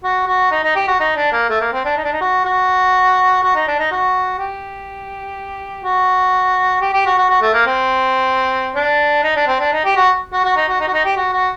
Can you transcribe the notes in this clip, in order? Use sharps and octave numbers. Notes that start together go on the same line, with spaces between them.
F#4
F#4
D#4
D#4
G4
F#4
D#4
D4
A#3
A3
A#3
C4
D4
D#4
D4
D#4
F#4
F#4
F#4
D#4
D4
D#4
F#4
G4
F#4
G4
G4
F#4
F#4
F#4
A3
A#3
C4
D4
D#4
D4
C4
D4
D#4
G4
F#4
F#4
F#4
D#4
F#4
D#4
F#4
D#4
G4
F#4
F#4